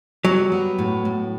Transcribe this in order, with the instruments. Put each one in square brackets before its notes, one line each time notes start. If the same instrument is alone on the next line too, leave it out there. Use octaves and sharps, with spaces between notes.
[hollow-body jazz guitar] F#3 [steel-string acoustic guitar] G3
[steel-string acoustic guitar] B3
A2
A2